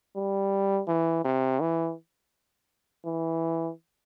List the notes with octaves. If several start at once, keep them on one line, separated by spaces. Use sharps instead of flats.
G3
E3
C3
E3
E3